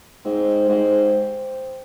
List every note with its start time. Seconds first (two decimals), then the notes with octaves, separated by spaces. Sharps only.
0.25 G#2 C4
0.68 G#2 G4 C5 D#5